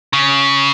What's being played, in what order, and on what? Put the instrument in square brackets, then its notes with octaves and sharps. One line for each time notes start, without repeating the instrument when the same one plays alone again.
[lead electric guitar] C#3